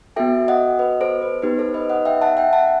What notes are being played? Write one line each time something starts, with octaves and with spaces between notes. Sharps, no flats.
B3 F#4 A4 E5 G5
D#5 F#5
B4 D#5
A4 C5
B4
B3 D#4 G4 B4
A4 C5
B4 D#5
D#5 F#5
E5 G5
F#5 A5
E5 G5
F#5 A5